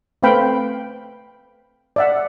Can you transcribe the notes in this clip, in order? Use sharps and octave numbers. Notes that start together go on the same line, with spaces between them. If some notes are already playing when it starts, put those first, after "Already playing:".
A3 C4 B4 F5 G5 B5
D5 E5 F#5